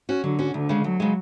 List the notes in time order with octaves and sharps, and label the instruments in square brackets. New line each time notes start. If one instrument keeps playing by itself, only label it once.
[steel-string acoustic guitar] C#4 F#4
[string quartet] D3 [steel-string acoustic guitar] F#3
[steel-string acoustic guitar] C#4 F#4
[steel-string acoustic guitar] D2 [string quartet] D3
[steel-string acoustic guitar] C#3 G#3
[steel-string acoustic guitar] D2 [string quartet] F#3
[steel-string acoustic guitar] C#3 G#3